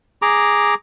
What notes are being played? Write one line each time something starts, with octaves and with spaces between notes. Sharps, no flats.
G#4 A#5 D6